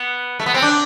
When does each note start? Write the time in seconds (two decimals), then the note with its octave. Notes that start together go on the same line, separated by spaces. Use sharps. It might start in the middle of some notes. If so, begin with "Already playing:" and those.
Already playing: B3
0.40 A3
0.46 B3
0.54 C4
0.62 D4